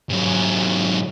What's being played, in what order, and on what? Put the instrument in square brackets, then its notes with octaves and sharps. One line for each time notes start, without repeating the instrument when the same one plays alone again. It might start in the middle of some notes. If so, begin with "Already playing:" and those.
[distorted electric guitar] G#2 F#3